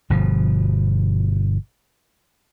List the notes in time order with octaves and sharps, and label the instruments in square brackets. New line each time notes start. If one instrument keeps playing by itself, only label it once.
[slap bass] G1 B2 F3